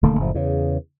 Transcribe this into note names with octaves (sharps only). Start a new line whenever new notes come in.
D#1 D3 A3 A#3
F#1 A2 F3
E2 C#3